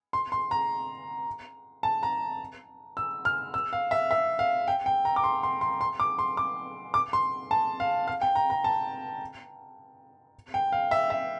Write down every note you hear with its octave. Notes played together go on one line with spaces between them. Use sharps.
C6
C6
A#5
A5
A#5
E6
F6
E6
F5
E5
E5
F5
G5
G5
A#5
D6
C6
C6
C6
C6
D6
C6
D6
D6
C6
A5
F5
F5
G5
A#5
A#5
A5
G5
F5
E5
E5